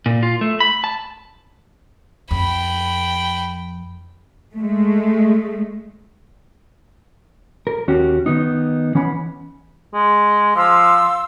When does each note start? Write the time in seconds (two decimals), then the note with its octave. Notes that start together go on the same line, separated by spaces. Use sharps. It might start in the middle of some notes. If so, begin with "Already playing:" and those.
0.06 A#2
0.23 F4
0.41 A3
0.60 B5
0.84 A5
2.31 F2 G5 B5
4.55 G#3 A3
7.67 A#4
7.88 D#2 C#4 F#4 G4
8.26 D#3 B3 D#4
8.95 E3 C#4 F#5 B5
9.94 G#3
10.56 F3 F5 C6 E6